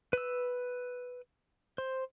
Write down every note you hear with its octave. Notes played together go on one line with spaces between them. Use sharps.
B4 E6
C5